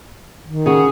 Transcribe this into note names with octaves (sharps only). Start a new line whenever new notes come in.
D#3
C#3 F#4 G#4